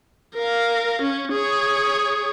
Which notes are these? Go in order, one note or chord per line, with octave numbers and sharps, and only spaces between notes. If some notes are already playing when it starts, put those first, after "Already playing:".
A#4 F5
C#4
G#4 C#5